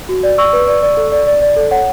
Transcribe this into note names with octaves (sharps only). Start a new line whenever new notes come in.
F#4
D5
D5 C#6 E6
B4
D5
D5
A4
D5
D5
D5
A4
C#5 F#5